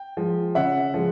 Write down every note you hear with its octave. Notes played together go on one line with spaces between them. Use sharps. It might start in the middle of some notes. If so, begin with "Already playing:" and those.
Already playing: G5
F3 G#3
C#3 E5 F#5
F3 G#3